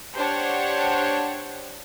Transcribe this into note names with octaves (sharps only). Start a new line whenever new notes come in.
D4 G4 C5 C#5 F#5